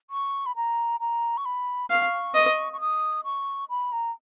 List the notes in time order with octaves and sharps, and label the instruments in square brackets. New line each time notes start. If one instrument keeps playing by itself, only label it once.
[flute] C#6
B5
A#5
A#5
C#6
B5
[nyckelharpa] F5 [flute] C#6
[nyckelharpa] D#5
[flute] C#6
D#6
C#6
B5
A#5